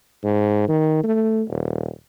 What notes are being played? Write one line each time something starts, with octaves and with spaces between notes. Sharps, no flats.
G#2
D#3
A3
D#1